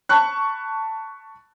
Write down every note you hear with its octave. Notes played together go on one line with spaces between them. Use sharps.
A5 B5 C#6 F#6